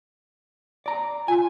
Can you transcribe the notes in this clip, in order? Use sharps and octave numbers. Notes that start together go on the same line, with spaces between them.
D5 A#5
F4 G#5